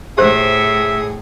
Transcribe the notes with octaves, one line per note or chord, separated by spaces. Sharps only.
A2 G4 G#4 C5 E5